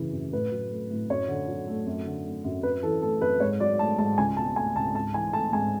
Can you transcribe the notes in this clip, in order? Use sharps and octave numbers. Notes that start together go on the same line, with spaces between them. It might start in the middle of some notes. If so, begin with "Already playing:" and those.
Already playing: F#2 C#3 E3
F#2
A2 B4
F#3
A3
A2
F#2 C#5
D3
F#3
A3
F#2
D3
A3
F#2
F#2 B4
E3 A4
A3 A4
F#2 B4
G#2 C#5
F#3 D5
A3 A5
G#2 A5
C#2 G#5
B2 A5
A3 G#5
C#2 A5
G#2 A5
E3 G#5
A3 A5
G#2 G#5